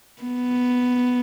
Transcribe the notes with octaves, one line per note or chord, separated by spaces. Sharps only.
B3